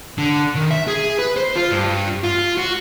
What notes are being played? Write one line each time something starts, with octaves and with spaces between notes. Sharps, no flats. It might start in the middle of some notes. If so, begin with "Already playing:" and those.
D3
D#3
E5
G#4
B4
C5
F4
G2
F4
F#4